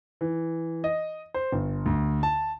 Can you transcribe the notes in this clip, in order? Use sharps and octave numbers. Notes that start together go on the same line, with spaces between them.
E3
D#5
C5
G1
D2
A5